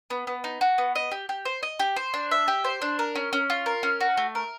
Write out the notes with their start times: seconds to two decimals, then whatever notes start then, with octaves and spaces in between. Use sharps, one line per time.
0.10 B3
0.27 B3
0.44 D#4
0.61 F#4
0.78 B3
0.95 D#5
1.11 G4
1.29 G4
1.45 C5
1.63 D#5
1.79 G4
1.96 C5
2.14 D4
2.31 E5
2.48 G4
2.64 C5
2.82 D4
2.99 A#4
3.15 C#4
3.33 C#4
3.50 F4
3.66 A#4
3.83 C#4
4.01 F#4
4.17 A3
4.35 A#4